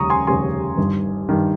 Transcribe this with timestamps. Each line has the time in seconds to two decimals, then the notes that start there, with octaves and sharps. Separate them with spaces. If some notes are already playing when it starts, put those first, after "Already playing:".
Already playing: F1 D#2 C#3 G3 A#5 C#6 D#6
0.10 G#5 C6
0.27 F1 D#2 C#3 G3 G#5 C6
0.78 G1 G2 D#3
1.29 G2 D#3